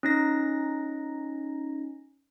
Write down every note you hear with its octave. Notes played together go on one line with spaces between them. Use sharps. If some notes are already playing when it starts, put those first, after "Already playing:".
C#4 D#4 A#6